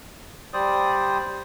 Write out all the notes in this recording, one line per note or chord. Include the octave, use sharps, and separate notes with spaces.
G3 C5 D5 D#6